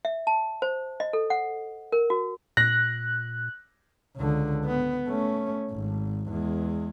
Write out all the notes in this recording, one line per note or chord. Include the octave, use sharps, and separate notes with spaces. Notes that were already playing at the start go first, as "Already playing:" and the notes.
E5
A5
C5
D#5
A4
F#5
A#4
F#4
A#2 F#6 A#6
C#2 D3
B3
A3 C#4
G#1
E2 G#3